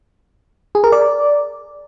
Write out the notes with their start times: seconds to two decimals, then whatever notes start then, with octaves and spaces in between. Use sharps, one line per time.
0.75 G#4
0.84 A#4
0.92 D5